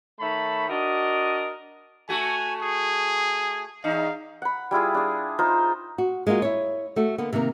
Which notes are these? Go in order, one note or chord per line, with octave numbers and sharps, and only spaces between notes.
D#3 A3 C#5 E5 A5 B5
D4 F#4 A#4 D#5
A3 F#4 G#5
G#4
E2 D#4 F5
F#5 B5
G3 E4 F4 G#4
D4 G#4
D#4 F4 C5
F#4
G#3 A#3 D#4 F4 F#4
E4 C#5
A3 F#4 A4
D3 A#3 B3
C3 D#3 A#3 A#4